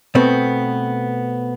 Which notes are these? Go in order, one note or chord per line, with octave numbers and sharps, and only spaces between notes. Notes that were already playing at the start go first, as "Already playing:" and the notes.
B2 A3 B3 C4